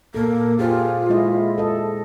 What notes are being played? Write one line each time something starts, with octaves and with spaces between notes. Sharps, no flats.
A#2 A#3 A4
F4 G4 G#4 C5
G#3 E4 D#5
A4 D#5